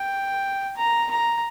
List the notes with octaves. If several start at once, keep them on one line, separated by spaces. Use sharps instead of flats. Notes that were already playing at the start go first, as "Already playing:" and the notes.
Already playing: G5
A#5
A#5